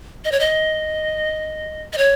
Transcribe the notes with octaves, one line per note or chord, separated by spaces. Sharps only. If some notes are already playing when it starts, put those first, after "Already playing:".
D#5
C#5
D#5
D#5
C#5